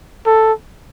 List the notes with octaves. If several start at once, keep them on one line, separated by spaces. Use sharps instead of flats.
A4